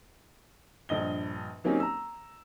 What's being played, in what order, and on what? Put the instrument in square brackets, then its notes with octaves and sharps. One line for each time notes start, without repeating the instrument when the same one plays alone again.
[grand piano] A#1 G2 D#5 G7
F#3 A#3 C4 C#4 D#4 G4
A#5 E6